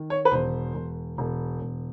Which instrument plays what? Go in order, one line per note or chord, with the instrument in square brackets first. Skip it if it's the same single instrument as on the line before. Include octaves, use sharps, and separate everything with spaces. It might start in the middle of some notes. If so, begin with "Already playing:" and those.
Already playing: [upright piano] D#3
C#5
B4
E1 C5
E1
E1
E1